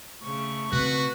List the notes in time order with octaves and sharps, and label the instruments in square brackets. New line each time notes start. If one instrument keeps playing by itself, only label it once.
[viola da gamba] C#3 [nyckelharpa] A3 C#6
[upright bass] C#3 C4 [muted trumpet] F#4 [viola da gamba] B4